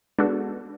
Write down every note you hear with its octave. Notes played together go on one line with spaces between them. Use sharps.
G#3 B3 D4 F#4 A4